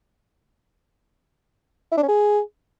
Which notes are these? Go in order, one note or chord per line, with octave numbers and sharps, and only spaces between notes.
E4
D4
C#4
G#4